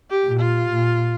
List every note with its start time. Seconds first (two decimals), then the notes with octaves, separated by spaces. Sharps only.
0.10 G4
0.25 A#2
0.40 F4
0.71 A#2